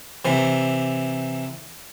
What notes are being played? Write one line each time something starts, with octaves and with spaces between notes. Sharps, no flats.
C3 E3